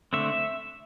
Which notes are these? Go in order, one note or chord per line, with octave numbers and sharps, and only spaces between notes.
D3 A3 C4 E5